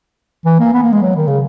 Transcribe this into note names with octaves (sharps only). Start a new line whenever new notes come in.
E3
A#3
B3
A#3
G#3
F#3
D#3
C#3